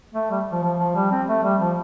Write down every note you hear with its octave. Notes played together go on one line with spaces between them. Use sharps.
A3
G3
F3
F3
F3
G3
C4
A3
G3
F3